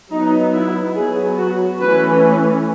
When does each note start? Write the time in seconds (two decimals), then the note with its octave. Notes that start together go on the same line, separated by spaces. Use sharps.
0.10 F#3 B3 D#4
0.53 E4
0.95 F#3 B3 G#4
1.38 F#4
1.80 E3 A3 C#4 B4